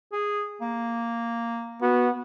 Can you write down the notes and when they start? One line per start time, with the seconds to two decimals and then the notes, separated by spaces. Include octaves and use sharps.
0.12 G#4
0.61 A#3
1.82 B3 F#4